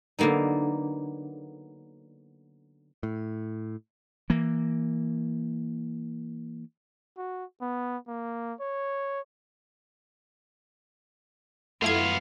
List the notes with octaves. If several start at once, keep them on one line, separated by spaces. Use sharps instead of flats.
D3 F#3 A#3 B3 D#4
A2
E3 A#3
F#4
B3
A#3
C#5
F#2 A3 B3 E4 F4 F5 G#6